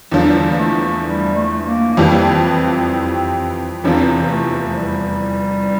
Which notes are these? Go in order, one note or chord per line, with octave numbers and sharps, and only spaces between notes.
E2 D3 F3 G3
A#3
A3
G3
A3
A3
A#3
A#3
F2 E3 G3 C4
F1 E2 C3 F3 C4
A3
F3
G3